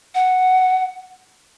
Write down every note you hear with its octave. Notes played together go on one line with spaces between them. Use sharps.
F#5